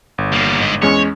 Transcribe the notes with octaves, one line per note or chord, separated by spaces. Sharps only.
G1
G3 A#3
G#2 D#5
E2 G#3 C#4 C#5